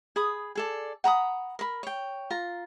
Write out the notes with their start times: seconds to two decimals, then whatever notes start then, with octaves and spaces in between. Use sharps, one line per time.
0.16 G#4 B5 D#6
0.55 G#4 A4 D5
1.04 F#5 A#5 B5 D#6
1.59 A#4 B5
1.83 C#5 G5
2.30 F4 A#5